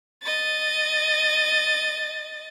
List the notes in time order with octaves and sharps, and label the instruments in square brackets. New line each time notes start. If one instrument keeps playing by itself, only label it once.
[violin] D#5 A6